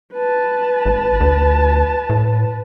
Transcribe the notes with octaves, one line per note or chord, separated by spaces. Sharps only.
B4 A5
G#1
D2
A2